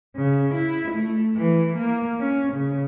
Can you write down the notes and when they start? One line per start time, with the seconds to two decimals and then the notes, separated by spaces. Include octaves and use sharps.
0.17 C#3
0.55 E4
0.91 A3
1.37 E3
1.77 A#3
2.20 C#4
2.53 C#3